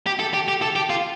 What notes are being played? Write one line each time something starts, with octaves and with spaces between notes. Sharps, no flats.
G4
A4
G4
G4
A4
G4
F4